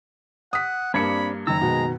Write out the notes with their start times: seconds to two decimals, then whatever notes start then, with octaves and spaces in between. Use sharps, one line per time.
0.53 F#5 D#6 B6
0.94 G2 A#3 C4 D4 B5 G#6 C#7
1.47 F#1 D#3 A#5 E6
1.62 B2 G#3